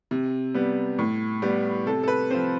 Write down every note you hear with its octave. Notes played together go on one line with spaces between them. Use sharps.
C3
G3 B3
A2
G3 B3
C3 A4
A4
B4
F3 C4 C5